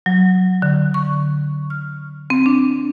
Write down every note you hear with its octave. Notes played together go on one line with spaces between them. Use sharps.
F#3
D3
C#6
F6
C4
D4